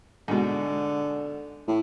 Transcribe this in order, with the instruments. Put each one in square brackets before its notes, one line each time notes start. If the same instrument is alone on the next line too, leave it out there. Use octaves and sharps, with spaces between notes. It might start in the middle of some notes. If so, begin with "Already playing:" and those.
[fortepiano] G#2 B2 [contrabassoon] D3
[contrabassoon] A2